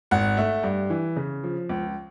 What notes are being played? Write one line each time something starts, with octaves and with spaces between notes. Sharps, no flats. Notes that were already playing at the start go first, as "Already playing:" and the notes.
G#1 F#5
A3
G2
E3
C#3
F3
C#2